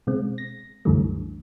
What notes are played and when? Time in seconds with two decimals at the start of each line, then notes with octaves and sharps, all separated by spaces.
0.07 B2 G#3 C4
0.38 A#6
0.85 C2 F#2 D3 E3 G3 A3